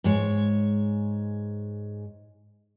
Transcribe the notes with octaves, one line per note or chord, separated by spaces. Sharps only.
G#2 G#3 C#5